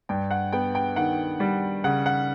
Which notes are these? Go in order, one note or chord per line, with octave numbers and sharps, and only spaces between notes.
G2 G5
F#5
B3 G5
G5
D#3 F#5
G3
C#3 F#5
F#5